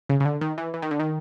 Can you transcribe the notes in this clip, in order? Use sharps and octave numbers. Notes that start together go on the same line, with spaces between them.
C#3
C#3
D3
D#3
E3
E3
D#3
D3
D#3